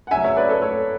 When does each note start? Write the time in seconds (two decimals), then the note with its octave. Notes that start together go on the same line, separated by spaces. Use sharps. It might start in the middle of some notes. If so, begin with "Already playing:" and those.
0.07 F#5
0.11 C#3 F#3 E5 G#5
0.24 C#5 E5
0.36 B4 D5
0.49 A4 C#5
0.62 A4 C#5